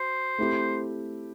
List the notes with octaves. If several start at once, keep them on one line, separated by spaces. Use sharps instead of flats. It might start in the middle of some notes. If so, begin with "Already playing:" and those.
Already playing: F#4 C5
A3 C4 E4 G4